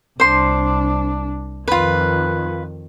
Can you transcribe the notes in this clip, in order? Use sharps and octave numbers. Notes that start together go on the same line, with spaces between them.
C2 D4 C5 C6
F2 D#3 F4 B4